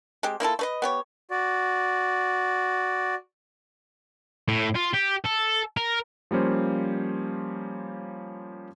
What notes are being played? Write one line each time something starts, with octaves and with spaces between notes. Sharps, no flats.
G#3 C4 G4
A#3 E4 F4 A4
A3 B4 D#5
B3 G4 C#5
F#4 D5
A2
F4
G4
A4
A#4
F3 G3 A#3 C#4 C5